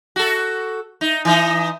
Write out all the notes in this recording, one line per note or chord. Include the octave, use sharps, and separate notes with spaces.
F#4 A4
D#4
E3 D#4